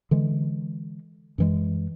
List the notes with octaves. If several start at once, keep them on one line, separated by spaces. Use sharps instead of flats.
D3 E3 G#3
F#2 E3 G#3